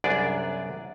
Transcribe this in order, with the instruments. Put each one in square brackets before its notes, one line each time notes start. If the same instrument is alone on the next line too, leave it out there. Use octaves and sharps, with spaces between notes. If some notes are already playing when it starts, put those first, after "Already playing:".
[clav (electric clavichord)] C2 F#2 B3 D4 G#4 D5